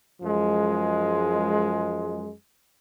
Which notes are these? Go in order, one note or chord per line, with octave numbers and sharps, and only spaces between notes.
F#2 F3 G#3